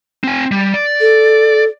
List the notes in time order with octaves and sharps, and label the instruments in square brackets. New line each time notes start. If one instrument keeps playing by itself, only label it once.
[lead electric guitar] C4 G#5
G3
D5
[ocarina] A4